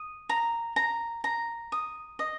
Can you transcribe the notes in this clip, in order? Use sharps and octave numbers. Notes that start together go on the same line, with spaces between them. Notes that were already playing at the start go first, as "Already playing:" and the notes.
Already playing: D#6
A#5
A#5
A#5
D#6
D#5